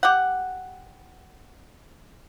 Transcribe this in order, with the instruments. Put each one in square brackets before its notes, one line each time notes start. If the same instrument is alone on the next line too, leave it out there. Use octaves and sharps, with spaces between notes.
[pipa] G4 F#5